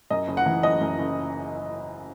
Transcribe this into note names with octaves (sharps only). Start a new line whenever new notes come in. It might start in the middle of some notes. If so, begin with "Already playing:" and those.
F#2 D#5
F#1
F#5
E3
F#1 D#5
F#2
F#1